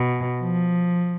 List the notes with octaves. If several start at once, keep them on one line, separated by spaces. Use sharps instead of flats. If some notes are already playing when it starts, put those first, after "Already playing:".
Already playing: B2
F3